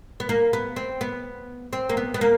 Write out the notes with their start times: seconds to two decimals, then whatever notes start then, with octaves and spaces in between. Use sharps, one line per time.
0.20 B3
0.29 A#3
0.53 B3
0.76 C4
1.01 B3
1.73 C4
1.89 A#3
1.97 B3
2.14 B3
2.21 A#3